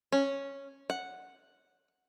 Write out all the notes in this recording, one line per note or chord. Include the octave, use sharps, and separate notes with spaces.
C#4
F#5